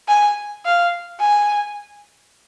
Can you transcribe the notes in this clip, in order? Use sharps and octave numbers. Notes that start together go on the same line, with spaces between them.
G#5
F5
G#5